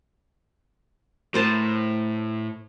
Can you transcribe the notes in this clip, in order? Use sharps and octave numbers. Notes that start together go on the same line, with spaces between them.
A2 A#4 C5 A5